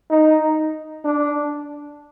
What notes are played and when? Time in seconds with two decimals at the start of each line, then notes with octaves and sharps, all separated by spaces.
0.10 D#4
1.05 D4